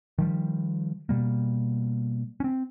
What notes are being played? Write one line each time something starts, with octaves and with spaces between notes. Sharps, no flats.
D#3 F3 G3
B2 G3 A#3
C4 C#4